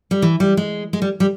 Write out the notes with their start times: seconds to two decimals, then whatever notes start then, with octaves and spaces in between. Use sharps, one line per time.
0.11 G3
0.22 E3
0.40 G3
0.57 G#3
0.93 G#3
1.02 G3
1.20 G3